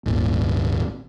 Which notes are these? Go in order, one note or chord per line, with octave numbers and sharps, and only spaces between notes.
D#1 G#1